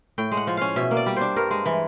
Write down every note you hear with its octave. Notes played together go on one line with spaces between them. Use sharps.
A2 G5
G#3
F#5
F3
C#4 F5
B2 E5
A#3
D5
G3
D4 C5
G2 A#4
G#3
E3